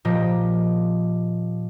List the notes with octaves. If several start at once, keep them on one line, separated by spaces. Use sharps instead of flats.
A#2 F3 G4 D#5